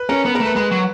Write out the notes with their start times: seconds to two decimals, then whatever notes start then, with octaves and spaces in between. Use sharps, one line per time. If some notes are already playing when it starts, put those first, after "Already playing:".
Already playing: B4
0.09 C#4 A#4
0.25 B3 B4
0.35 A#4
0.40 A3
0.45 B4
0.56 G#3 B4
0.71 F#3